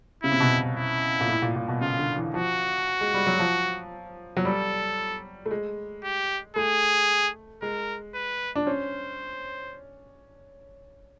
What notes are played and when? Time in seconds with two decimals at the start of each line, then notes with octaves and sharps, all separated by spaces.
0.23 C#3 E4
0.32 C3
0.40 B2
0.49 C3
0.76 E4
1.21 A#2
1.29 A2
1.42 A#2
1.56 A#2
1.68 B2
1.81 C#3 F4
1.99 D3
2.17 E3
2.34 F3 F#4
3.01 G#3
3.14 G3
3.26 F#3
3.39 F3
4.37 F#3
4.45 G3 A4
5.46 A3
5.51 G#3
6.04 G4
6.56 A3 G#4
7.62 G#3 A#4
8.14 B4
8.55 D4
8.67 C#4 C5